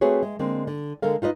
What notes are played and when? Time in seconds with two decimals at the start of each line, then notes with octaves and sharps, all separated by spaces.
0.01 A3 C4 F#4 G#4 B4 C#5
0.23 G#3
0.39 D3 G#3 A#3 C4
0.67 D3
1.02 D3 G#3 A4 A#4 F5
1.22 D#4 F4 B4 D#5